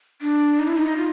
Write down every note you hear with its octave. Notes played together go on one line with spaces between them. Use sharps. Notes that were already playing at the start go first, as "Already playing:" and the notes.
D4
D#4
E4
D#4
F4